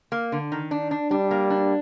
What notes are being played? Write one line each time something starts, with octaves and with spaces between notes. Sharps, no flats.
A#3
D3
D#3
D4
D4
G3 D4
A#3
D4